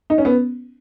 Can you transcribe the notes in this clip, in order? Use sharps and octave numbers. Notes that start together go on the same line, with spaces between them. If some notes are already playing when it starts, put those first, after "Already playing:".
D#4
C#4
B3